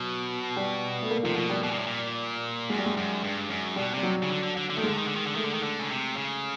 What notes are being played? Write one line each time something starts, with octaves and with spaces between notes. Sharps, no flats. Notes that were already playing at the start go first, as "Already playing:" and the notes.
Already playing: B2 F#3
G3
A3
A#3
C3 F3
B2 F3
G3
B2
A#2
A2
A#2
F#2 G#3
G3
G#3
F#2
G2
F#2
B2 G3
C3 G3
F#3
C#3
D3
D3
D3
D3
D#3 A3
D3 G#3
D#3
D3
D#3
D3
D#3 A3
D3
D#3
D3
C#3
C3
C#3